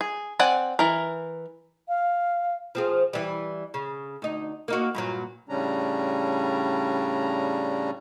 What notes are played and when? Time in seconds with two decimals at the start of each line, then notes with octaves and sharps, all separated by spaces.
0.01 G#4
0.39 C4 D5 F#5 G#5
0.79 E3 A#4
1.89 F5
2.75 F3 C4 G#4
3.13 E3 G3
3.74 C#3
4.22 D2 D#4
4.68 A#3 D#4 F#4
4.95 G2 A#2 F#3
5.49 A2 C#3 G3 C#4 D4 A#5